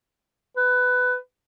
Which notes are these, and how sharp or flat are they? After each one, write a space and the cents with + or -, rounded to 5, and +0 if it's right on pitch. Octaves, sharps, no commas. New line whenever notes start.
B4 +15